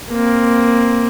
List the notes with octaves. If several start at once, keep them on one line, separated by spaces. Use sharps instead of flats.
A#3 C4